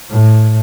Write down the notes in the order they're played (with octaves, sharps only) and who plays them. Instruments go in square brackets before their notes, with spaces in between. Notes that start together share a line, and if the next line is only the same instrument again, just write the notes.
[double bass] A2